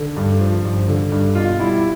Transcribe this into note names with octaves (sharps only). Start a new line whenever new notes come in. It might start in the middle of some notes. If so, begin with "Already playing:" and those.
Already playing: D3
G2
F3
G2
D3
G2
B2 F4
G3 E4